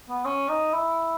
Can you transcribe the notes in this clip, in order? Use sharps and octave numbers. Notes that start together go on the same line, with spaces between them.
B3
C#4
D#4
E4